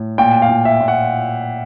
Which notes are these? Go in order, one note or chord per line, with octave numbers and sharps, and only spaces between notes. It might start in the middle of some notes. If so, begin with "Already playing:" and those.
Already playing: A2
A#2 G5
F5
A#2
E5
A#2
F#5